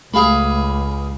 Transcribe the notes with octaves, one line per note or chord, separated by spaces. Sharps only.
C#2 A3 G#4 F5 B5